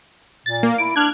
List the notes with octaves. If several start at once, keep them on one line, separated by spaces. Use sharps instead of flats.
A#2 A6
A#3
E4 D7
D4 F6 F#6 G#6